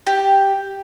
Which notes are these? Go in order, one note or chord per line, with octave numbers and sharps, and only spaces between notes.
G4